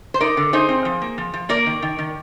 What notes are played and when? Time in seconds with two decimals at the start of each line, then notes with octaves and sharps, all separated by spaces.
0.14 C5
0.21 D#4 A#4 D5
0.37 D3
0.53 D#4 G#4 C5
0.69 C4
0.85 F3
1.02 A#3
1.18 F3
1.34 F3
1.49 A#3 A#4 D5
1.66 D#3
1.82 D#3
1.98 D#3